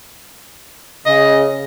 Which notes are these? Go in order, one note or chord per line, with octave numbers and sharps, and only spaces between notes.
C#3 D#5